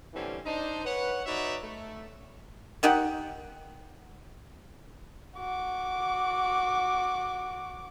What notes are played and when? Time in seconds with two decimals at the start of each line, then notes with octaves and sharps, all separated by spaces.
0.14 D3 E3 G3 C4 C#4
0.46 D4 D#4 C5
0.85 B4 C#5 F#5
1.26 D#4 F#4 B4 C#5 D5 E5
1.63 A3
2.83 D#3 D#4 G4 F#5
5.37 F#4 D6